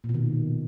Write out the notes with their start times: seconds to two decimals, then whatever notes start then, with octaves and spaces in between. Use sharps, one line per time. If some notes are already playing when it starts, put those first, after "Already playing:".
0.04 A#2
0.09 B2
0.14 D#3